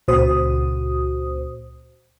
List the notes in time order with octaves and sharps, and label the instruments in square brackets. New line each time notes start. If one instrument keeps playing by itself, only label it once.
[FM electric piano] C#2 A#2 F#4 C5 D#6